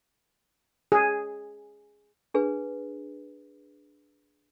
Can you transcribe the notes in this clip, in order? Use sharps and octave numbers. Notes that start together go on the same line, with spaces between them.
G#4
D4 G#4 B4